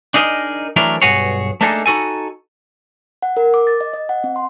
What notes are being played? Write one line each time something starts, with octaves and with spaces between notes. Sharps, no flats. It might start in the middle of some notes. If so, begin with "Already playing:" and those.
D4 D#4 G#4 A#4 D#5
E3 F#3 A3 D4 E4 A#4
B1 G2 F#4 G#4 C#5
A3 A#3 D4 D#4 G#4 A4
D#4 F#4 A4 G#5
F#5
A#4
D6
A6
D#5
D#5
F#5
C4
C6